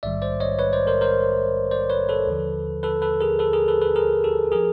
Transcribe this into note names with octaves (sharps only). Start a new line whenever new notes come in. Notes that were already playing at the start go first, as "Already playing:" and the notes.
A#1 G#2 D#3 G3 D5 E5
C5 D5
C#5 D#5
B4 C#5
C5 D5
A#4 C5
A#4 C5
C5 D5
B4 C#5
A4 B4
D#2 D3 F3
A4 B4
A4 B4
G#4 A#4
A4 B4
G#4 A#4
A4 B4
A4 B4
G#4 A#4
G4 A4
F3 G#4 A#4